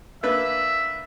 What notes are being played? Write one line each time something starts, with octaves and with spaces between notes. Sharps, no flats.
A#3 D4 B4 E5